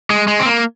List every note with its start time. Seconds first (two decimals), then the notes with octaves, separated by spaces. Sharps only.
0.10 G#3
0.28 G#3
0.40 C4
0.45 A#3